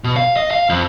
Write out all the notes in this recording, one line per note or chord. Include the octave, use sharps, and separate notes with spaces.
B2
F5
D#5
F5
F2